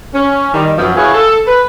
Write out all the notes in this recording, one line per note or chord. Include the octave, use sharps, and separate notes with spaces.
C#4
D#3 G3 D#4
F#2 F3 B3
E4 F#4 G#4 B4 C#5 F5
A4
B4